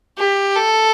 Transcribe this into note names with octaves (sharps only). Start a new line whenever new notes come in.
G4
A4